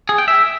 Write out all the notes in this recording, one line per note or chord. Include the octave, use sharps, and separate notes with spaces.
G#4
G5
E5